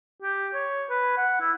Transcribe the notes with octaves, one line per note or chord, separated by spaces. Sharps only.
G4
C#5
B4
F#5
E4